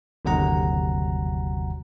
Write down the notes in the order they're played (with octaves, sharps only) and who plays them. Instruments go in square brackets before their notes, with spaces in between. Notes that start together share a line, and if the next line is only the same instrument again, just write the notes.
[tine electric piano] G1 D#2 C3 F#3 F#5 A#5